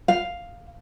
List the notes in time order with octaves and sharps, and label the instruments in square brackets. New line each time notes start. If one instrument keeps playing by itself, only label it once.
[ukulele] F5